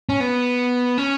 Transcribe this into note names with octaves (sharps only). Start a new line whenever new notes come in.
C#4
B3
C#4